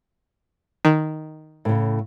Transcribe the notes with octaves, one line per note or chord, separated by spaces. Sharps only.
D#3
A2 C#3